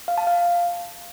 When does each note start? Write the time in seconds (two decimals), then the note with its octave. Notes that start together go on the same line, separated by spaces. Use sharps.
0.08 F5
0.18 A5
0.27 F5